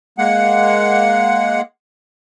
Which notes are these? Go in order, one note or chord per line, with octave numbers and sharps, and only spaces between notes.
G#3 A#3 F#5